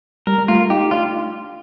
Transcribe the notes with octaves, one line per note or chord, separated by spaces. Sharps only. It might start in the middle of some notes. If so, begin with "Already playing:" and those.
G3 A#4
G3
A3 F4
D#4 G4
D4 F4